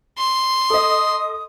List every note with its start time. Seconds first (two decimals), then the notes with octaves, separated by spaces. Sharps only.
0.18 C6
0.70 A4 D#5 D#6